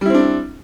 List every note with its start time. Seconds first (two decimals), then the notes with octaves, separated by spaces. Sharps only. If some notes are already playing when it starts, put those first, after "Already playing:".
0.01 G3
0.06 E4
0.10 C4
0.14 D4